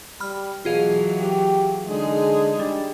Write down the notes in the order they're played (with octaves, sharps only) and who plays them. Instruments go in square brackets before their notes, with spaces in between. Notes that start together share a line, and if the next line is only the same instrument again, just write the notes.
[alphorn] G3 [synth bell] B5 F6
[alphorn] B2 [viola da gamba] E3 F#3 [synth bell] F4 G#4 F5
[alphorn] G4
[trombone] D3 [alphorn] G#3 [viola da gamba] D#4 G#4
[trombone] G3 [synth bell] D4